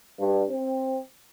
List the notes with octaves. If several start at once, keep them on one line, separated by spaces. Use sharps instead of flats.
G2
C4